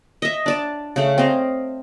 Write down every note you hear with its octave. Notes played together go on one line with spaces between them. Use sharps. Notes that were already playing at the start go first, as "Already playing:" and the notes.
D#5 E5
D4 D5 A5
C#3 A3
C4 D#5 F5